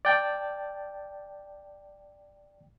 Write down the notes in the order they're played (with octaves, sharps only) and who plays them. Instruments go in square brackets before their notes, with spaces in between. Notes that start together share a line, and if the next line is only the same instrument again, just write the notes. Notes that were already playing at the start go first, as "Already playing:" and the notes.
[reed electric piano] D5 G5 A5